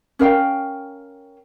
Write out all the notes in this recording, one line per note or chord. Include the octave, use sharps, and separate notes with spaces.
C#4 A#4 F5 G5